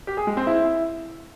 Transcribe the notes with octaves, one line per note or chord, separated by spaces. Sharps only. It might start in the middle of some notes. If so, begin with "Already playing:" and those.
G4
G#4
G#3
C4
E4